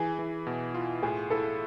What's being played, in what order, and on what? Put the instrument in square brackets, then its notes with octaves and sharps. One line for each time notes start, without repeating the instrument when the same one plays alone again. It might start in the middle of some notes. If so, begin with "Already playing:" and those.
Already playing: [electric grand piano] E3 [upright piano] G#4
[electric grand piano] E3
B2
F4
[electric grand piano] A2 [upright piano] G#4
[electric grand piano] E4 [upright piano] A4